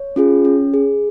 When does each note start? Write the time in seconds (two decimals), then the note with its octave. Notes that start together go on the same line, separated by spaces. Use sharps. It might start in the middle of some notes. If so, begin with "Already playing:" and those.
Already playing: C#5
0.16 C#4 F4 G#4
0.45 C#4
0.74 G#4